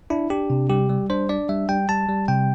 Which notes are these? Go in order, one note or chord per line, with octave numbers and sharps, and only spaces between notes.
D4 E4
D4 G4
C3
G3 G4
G3
D4 C5
D4 D5
G3 E5
G3 G5
G3 A5
G3
C3 G5